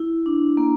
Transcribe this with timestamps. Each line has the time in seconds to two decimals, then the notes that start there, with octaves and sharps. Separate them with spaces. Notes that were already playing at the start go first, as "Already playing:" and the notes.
Already playing: E4
0.26 D4
0.57 A#3